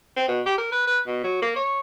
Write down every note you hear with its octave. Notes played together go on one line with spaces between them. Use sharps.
C4
B2
G4
A#4
B4
B4
B2
F#3
A#3
C#5